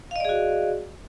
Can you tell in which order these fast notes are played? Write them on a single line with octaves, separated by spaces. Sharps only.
F5 D#5 D5 G#4 F#4